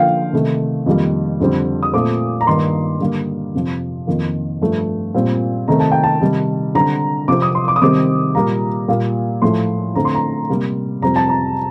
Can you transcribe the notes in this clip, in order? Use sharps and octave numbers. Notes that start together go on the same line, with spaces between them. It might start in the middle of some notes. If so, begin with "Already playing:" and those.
Already playing: D3 F3 A#3 F5 G5
C3 D#3 A3
F2 D#3 G3 A#3
F2 D3 G3 C4
D#6
A#2 A3 C4 D6
A#5
G2 D#3 A#3 C6
D3 G3 A#3
F2 C3 F3
F2 D#3 A#3
G2 F3 A3
A#2 G3 C4
C3 D#3 A3 C4 A#5
A5
G5
A5
C3 D#3 G3
D3 G3 C4 A#5
C3 F3 C4 D6
D#6
C6
D6
D#6
C3 D#3 G3 C4 D6
A#2 G3 A#3 A#5
A#2 G3 A#3
A2 F3 A3 C6
D3 A3 C4 A#5
C6
A#5
C3 G3 A#3
F2 C3 G3 C4 A#5
A5
A#5